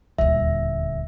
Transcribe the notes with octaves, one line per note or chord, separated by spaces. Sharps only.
D#1 D2 E5